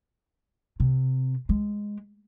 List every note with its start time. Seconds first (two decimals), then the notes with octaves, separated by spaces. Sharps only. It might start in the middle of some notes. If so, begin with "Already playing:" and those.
0.80 C3
1.49 G#3